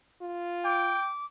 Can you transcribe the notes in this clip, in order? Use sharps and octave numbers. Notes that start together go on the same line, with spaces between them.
F4
G5 D6